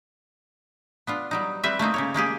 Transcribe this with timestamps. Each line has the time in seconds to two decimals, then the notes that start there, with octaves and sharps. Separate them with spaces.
1.07 B3 D4 F4
1.31 F#3 G3 D#4
1.63 G3 C4 B4 E5
1.79 A3 A#3 C4 D#4
1.94 C#3 A#3 C#5
2.14 G#3 A#3 G4 G#4